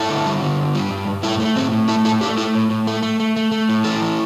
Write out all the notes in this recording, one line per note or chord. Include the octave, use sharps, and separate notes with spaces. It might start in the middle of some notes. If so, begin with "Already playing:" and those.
Already playing: G2 E4 A4
D3
G3
D3
G2
G3
G2
G2
A2 E4 A4
A3
A2 C4
A2
A3 E4 A4
A2 E4 A4
A3 D4 G4
A3 E4 A4
A2
A2
A3
A3
A3
A3
A3
A2
E3 E4 A4
E3